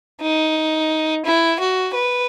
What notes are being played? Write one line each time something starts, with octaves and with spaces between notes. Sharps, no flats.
D#4
E4
F#4
B4